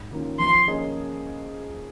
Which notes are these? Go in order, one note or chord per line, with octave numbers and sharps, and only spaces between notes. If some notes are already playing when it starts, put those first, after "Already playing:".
Already playing: G#2
D#3 A#3 C#4 F4
F3 C6
A#3 C#4 G#4 D#5